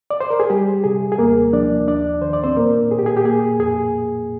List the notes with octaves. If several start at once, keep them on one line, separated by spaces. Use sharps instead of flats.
D5
C5
A#4
G#4
G3 G4
C3 G#4
G#4
D#2 A#3 A#4
F3 D4 D5
D#2 D4 D5
D#3 C5
D5
C4 C5
A#2 A#3 A#4
A#2 G#4
G4
G#4
G4
A#3 G#4
F2 G#4